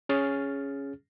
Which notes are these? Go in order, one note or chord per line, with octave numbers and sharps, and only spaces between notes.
C#4 G#4 F6 A6